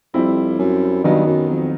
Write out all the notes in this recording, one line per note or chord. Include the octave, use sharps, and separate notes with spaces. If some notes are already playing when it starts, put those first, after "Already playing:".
F2 G3 C4 E4
F#2
G2 D#3 F#3 B3 D#4
F#2
F2